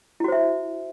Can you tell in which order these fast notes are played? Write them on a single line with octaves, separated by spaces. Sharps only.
E4 F#4 C5 E5